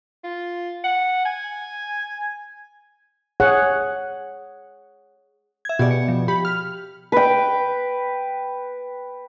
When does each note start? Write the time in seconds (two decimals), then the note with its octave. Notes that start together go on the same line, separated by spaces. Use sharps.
0.24 F4
0.84 F#5
1.25 G#5
3.40 G#4 C#5 F#5
5.65 E5 G#6
5.79 B2 G4 G#4 D5
5.91 C#7
6.08 F3
6.28 G4 B5
6.45 F6
7.12 B4 G5